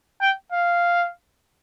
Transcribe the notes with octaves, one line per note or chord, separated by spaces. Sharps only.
G5
F5